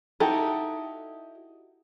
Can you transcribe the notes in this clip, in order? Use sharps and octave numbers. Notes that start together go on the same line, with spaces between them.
D#4 E4 F#4 G4 A4